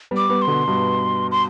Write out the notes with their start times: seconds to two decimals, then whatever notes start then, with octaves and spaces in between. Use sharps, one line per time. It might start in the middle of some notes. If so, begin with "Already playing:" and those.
0.11 G3 B3
0.17 D6
0.29 G3 B3
0.42 C6
0.48 B2 D3
0.68 G2 B2
1.31 C6